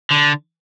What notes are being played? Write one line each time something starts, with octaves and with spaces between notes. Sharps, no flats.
D3